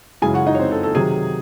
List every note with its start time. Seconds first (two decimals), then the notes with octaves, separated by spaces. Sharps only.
0.22 F#2 C#3 E3 G#3 G#4 G#5
0.34 F#4 F#5
0.47 D#4 D#5
0.55 C#5
0.59 C4 C5
0.71 A4
0.83 A4
0.95 C3 D#3 F#3 G#4